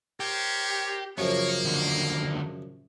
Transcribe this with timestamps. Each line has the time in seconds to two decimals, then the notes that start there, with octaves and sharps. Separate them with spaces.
0.20 G4 A#4 C5 C#5
1.18 F#2 C#3 F3 A#3 C#5
1.65 D#2 D3